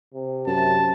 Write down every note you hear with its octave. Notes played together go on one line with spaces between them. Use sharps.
C3
F#2 A5